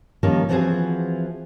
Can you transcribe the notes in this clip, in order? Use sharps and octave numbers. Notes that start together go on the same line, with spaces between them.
D#3 F3 G3 A#3 C#4 A#4
E3 F3 B3 C4 F#4 G#4